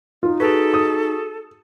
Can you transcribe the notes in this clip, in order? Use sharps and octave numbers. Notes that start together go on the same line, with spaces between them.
D#4 F4
F#4 G#4 A4 B4
D#6